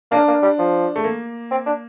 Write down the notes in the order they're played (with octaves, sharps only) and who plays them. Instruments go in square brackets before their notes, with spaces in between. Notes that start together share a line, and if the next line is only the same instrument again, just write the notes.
[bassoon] A#3 [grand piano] D4
[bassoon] A#3
G3
F3
[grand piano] A3
A#3
[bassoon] C4
D4